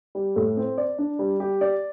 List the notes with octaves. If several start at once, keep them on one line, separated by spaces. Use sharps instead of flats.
G3
A2
C4
D5
D4
G3
G4
D5